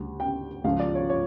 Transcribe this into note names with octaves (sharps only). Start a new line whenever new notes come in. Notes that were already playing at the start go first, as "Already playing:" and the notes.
Already playing: D2 C#3 G3
G5
C#2 C#3 F3 F5
D5
C#5
C#5